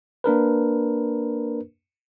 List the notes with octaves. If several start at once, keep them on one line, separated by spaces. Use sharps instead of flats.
A#3 D4 A#4 B4